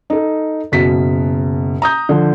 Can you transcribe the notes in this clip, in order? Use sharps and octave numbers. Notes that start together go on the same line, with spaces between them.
D#4 A4
F#1 B2 B6
A#5 D#6 G6
D3 F3